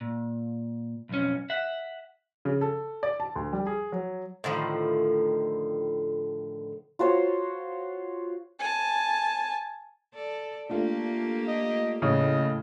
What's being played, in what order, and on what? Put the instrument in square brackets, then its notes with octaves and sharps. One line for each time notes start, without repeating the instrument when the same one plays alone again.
[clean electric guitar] A#2
B1 F2 C#4
E5 F#5
[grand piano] C#3
A4
D5
A5
D2
G3
G#4
F#3
[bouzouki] A2 D3 D#3 F3
[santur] F4 F#4 C5 C#5
[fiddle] G#5 A5
[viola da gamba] A4 D5
[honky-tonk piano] A3 D4 F4 [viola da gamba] A#3 G4
[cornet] D#5
[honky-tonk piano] A2 [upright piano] C#3 [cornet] D#5